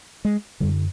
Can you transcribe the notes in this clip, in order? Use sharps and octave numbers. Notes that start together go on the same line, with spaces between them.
G#3
F#2 D3 G3